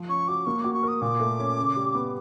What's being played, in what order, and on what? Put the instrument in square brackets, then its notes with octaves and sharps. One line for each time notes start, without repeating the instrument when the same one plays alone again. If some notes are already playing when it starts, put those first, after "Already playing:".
Already playing: [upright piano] F3
[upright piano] C#4 [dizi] C#6
[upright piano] F#4 [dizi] D6
[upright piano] A#3 [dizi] C#6
[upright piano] F#4 [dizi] D6
[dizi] C#6
[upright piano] A#4
[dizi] D#6
[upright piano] A#2 [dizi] D6
[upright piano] A3
C#4
C#3
G3
B3